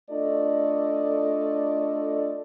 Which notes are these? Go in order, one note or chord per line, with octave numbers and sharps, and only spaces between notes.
A3 D4 F4 A4 D5 D#5